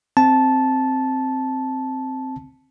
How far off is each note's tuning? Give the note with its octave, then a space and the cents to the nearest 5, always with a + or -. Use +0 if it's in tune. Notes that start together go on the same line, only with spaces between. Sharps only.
C4 +0 A5 -10